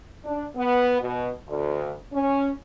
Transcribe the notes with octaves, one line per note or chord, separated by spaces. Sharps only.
D4
B3
B2
D2
C#4